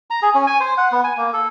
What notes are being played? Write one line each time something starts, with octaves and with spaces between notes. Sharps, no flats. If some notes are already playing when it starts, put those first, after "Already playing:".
A#5
G#4
C#4
G#5
C5
F#5
B3
G#5
A#3
A4